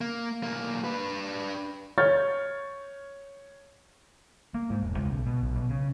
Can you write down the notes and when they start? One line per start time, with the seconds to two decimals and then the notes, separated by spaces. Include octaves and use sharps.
0.01 A#3
0.43 B1 A#3
0.84 D4 B4
1.98 C#5 C#6 F6 G6 A6
4.54 A#3
4.70 G#2
4.83 E1
4.97 C#2
5.11 B1
5.26 B2
5.43 B1
5.56 B2
5.70 C#3